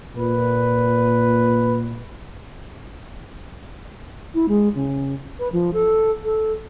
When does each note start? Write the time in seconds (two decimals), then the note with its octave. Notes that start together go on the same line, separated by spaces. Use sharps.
0.17 A#2 B4
4.34 E4
4.48 G#3
4.75 C#3
5.39 B4
5.52 F3
5.73 A4
6.24 A4